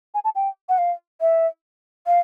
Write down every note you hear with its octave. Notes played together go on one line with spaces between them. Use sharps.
G#5
A5
G5
F#5
F5
E5
F5